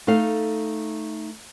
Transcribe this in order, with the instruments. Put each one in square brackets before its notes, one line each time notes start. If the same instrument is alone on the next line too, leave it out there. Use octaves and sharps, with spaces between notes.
[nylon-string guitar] A3 D#4 A4 F5